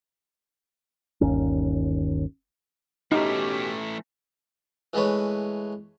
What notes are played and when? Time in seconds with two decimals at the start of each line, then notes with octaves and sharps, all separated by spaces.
1.21 G1 D#2 D#3 C#4
3.12 B2 E3 A3 C#4 D#4 G4
4.93 E3 G#3 A3 B4 C#5